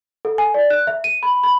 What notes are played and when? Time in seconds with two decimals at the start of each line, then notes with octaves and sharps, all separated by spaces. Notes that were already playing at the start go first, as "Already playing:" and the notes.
0.25 A4
0.38 G#5
0.54 D5
0.70 F#6
0.87 E5
1.04 D#7
1.23 B5
1.43 B5